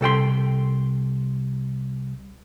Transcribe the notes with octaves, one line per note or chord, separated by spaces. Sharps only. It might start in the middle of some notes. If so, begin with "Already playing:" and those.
C2 A4 G5 C6